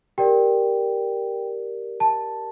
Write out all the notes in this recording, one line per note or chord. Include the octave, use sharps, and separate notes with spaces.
G4 A#4 D5 G5
A5